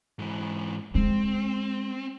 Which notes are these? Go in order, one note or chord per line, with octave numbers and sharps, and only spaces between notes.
G#2 E3
G#3 C4